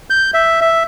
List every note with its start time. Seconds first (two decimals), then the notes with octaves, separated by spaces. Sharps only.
0.10 G6
0.34 E5
0.61 E5